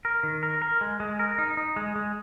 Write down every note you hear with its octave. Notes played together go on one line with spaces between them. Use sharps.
A#4
D#3
A#4
A#4
G#3
G#3
A#4
D#4
D#4
G#3
G#3